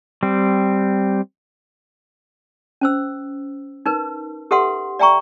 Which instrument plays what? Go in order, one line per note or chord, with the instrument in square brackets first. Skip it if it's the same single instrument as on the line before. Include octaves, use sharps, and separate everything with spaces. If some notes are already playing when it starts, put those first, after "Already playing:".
[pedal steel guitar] G3 C4
[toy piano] C#4 C5 E6
D#4 A#4 B4
G4 A4 B4 E5 F#5 C6
D5 E5 G5 A#5 C#6